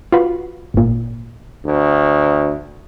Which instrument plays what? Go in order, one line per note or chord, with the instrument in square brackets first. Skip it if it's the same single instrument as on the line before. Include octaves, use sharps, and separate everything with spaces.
[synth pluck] F4 F#4 B4
G#1 A#2
[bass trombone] D2